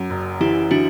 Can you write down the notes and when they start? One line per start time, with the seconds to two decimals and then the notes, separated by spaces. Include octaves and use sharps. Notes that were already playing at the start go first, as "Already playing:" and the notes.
Already playing: F#2
0.10 F#1
0.41 E3 E4 G4
0.71 E3 D4 F#4